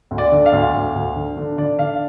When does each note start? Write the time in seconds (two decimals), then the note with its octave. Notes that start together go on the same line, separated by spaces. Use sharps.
0.11 D2
0.18 D5
0.32 D3
0.46 F5
0.53 D2
0.74 D2
0.95 D2
1.16 D3
1.37 D3
1.58 D3 D5
1.79 D3 F5